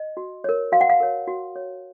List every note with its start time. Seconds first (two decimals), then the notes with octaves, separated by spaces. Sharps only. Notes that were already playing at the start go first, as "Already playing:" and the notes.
Already playing: D#5
0.17 F#4
0.44 A#4 C#5
0.72 F#4 F5
0.81 F#5
0.89 F5
1.00 A#4 C#5
1.27 F#4
1.56 C#5